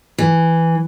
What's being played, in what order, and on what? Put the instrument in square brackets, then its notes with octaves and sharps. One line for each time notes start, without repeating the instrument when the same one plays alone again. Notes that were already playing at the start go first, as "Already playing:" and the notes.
[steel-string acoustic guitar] E3